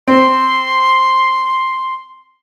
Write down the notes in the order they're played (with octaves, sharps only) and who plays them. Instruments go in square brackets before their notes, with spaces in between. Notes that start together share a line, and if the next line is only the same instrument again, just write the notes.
[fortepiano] C4 [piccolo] C6